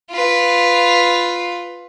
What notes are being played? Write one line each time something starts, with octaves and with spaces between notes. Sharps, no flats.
F4 B4